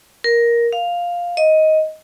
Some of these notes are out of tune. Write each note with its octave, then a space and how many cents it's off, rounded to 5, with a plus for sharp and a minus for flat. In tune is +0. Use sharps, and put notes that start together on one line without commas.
A#4 +10
F5 +5
D#5 +10